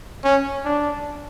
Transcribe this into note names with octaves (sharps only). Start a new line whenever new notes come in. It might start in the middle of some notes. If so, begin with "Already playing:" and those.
C#4
D4